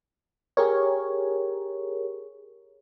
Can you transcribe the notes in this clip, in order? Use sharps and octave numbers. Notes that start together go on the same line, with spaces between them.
G4 G#4 A#4 C#5